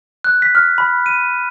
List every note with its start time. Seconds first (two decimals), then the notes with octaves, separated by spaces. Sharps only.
0.24 F#6
0.42 B6
0.55 F6
0.78 B5
1.06 D#7